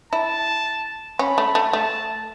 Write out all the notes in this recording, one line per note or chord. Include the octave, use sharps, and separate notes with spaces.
E4 A5
C#4 B5
A3
A3
A3 A5